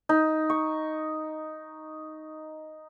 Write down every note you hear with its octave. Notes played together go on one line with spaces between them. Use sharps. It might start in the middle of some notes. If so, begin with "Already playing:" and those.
D#4
C#6